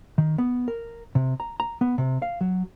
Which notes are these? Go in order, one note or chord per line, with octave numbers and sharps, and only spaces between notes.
D#3
B3
A#4
C3
A#5
A#5
B3
C3
F5
F#3